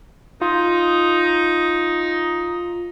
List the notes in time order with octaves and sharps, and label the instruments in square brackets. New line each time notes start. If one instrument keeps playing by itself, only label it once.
[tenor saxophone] D#4 [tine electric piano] F4